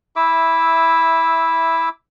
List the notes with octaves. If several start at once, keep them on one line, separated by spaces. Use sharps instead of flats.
E4 E5 D6 E6